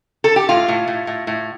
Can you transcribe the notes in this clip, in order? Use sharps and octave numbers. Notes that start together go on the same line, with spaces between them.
A4
G4
A2 F4
A2
A2
A2
A2